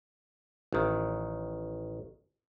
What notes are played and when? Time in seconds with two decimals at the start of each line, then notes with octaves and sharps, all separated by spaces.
0.73 A1 D#3